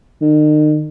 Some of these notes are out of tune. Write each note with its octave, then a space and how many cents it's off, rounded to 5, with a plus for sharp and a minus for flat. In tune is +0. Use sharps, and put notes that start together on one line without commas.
D#3 -40